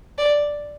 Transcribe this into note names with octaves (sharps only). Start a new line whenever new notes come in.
D5